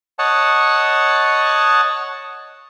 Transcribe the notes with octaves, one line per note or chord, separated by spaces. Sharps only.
C#5 D#5 F#5 A5